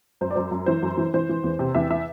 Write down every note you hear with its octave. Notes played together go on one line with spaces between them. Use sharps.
F#2 C5
D5
F#2 C5
F#2
E3 C5
F#2
E3
E3 C5
E3
E2
C3
E2 E5
E3 E5